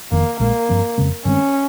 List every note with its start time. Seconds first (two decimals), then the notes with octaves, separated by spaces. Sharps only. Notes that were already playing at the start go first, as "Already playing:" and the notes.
0.11 F1 F2 D#3 A#3
0.40 A#1 A#2 G#3 A#3
0.69 G2 F3 C4
0.98 F2 C#3 G#3 C4
1.25 G2 D#3 G#3 C4 C#4